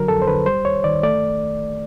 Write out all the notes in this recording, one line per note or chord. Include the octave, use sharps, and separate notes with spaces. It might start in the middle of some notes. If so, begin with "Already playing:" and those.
Already playing: D3 F#3 A#4
F2 A4
C5
D3 B4
G3 C5
D#2 C#5
D#3 D5
A3 D5